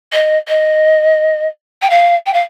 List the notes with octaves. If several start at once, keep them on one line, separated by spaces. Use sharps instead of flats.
D#5
D#5
G5
F5
G5
F5